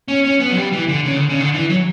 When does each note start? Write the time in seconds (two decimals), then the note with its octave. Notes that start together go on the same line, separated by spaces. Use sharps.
0.08 C#4
0.25 C#4
0.40 B3
0.50 F#3
0.57 G3
0.72 E3
0.89 D3
1.05 C#3
1.16 D3
1.29 C#3
1.40 D3
1.54 E3
1.70 F#3